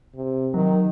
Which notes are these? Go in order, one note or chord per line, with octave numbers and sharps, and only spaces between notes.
C3
D#3 F#3